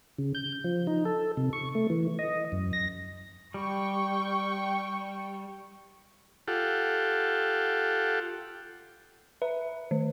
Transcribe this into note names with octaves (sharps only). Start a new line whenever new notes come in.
C#3
G6
F3
D#4
A4
C3
C#6
A3
E3
D#5
F#2
A#6
G3 G5 C#6
F4 G4 A4 F#5
B4 E5
D#3